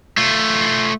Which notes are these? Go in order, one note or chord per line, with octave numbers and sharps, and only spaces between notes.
A3 F4